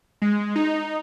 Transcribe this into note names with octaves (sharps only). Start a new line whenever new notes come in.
G#3
D#4